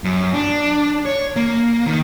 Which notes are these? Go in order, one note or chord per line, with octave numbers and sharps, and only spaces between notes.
F#2
D4
C#5
A#3
D#3